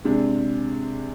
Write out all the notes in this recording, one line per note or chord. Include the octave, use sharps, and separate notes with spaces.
C3 G#3 D4